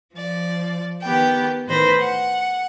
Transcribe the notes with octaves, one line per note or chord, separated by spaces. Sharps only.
F3 D5
D#3 B3 G4 G5
A2 D#3 B4 C5 B5 A#6
F#5